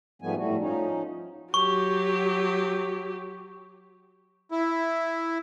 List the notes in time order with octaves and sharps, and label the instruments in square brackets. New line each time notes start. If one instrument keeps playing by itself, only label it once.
[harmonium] G#2 F3 G3 A3 B3 G#5
A2 G3 A3 F#4
F3 C#4 D#4
[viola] F#3 G4 [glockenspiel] C#6
[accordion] E4